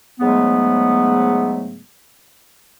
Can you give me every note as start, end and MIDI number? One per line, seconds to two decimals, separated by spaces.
0.20 1.80 44
0.20 1.80 49
0.20 1.80 54
0.20 1.80 56
0.20 1.80 57
0.20 1.80 59